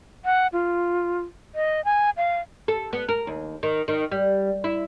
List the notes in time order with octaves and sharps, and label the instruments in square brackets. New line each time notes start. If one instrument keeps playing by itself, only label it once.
[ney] F#5
F4
D#5
G#5
F5
[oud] A4
B3
A#4
D#2
D#3
D#3
G3
E4